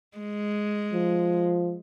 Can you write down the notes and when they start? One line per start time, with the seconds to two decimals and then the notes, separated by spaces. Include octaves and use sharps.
0.18 G#3
0.93 F3